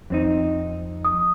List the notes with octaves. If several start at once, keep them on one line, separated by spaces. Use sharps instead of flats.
F2 C4 D#4
D#6